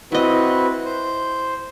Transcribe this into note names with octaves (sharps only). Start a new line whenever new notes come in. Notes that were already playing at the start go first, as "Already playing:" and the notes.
C4 E4 F#4 B4 D#5
C5